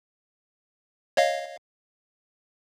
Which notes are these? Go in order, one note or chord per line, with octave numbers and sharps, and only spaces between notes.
C#5 D#5 F5